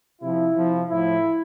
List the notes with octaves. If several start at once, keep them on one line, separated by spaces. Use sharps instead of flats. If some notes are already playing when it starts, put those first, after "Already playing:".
C3 F3 E4
C3 F3
A2 F3 E4